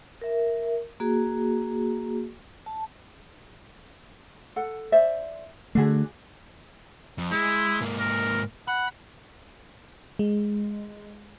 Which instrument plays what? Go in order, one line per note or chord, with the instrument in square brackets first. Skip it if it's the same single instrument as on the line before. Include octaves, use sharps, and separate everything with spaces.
[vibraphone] A#4 E5
A#3 F#4 G#4
A5
[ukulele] A4 F#5
C5 D5 E5
[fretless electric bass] D3 A3 [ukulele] D4 F#4 G#4
[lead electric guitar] F2
[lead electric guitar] G#3 [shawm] E4
[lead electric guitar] G#2 A#3
[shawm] A#4
[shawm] F#5 [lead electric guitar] B5
[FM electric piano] G#3